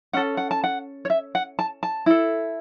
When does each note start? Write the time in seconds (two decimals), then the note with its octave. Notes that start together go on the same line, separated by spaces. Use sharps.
0.13 C#4 A4 F#5
0.37 F#5
0.51 A5
0.64 F#5
1.05 C#5
1.10 E5
1.35 F#5
1.59 A5
1.83 A5
2.06 E4 A4